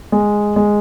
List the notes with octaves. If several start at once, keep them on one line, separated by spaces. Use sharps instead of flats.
G#3
G#3